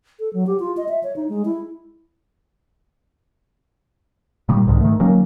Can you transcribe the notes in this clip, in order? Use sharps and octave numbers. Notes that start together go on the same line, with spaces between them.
A4
F#3
G4
F4
D#5
E5
C#5
D#4
G#3
E4
A#2 D#3 G3
C2 G#2 D3 D#3
D#3 A3
D#3 F#3 A#3 C#4